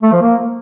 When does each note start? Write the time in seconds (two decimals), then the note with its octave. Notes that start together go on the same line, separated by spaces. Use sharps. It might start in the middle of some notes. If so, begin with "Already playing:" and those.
0.03 A3
0.12 F3
0.21 A#3